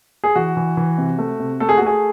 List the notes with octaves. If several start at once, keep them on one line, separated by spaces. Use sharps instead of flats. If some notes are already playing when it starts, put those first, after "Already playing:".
G#4
E3 F#4
E3
E3
C3
A3
C3
A3 A4
G#4
F#4
A3
G#4